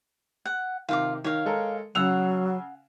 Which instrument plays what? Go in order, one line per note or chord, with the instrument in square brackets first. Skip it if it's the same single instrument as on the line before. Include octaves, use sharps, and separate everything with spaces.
[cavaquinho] F#5
[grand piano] C3 D#3 [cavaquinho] F4 F5 D6
[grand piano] D#3 [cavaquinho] C#5 F5
[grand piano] G#3 A4 A#4
[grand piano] C#3 E6 F7 [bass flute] F#3 [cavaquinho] F#5